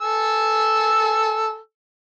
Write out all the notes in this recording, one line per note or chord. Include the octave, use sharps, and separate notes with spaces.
A4 G#5 E6